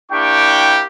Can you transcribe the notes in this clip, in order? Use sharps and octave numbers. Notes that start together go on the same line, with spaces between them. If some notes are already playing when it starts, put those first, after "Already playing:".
A#3 D4 E4 G4 G5 C#6